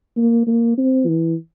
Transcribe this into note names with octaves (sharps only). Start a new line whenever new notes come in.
A#3
A#3
C4
E3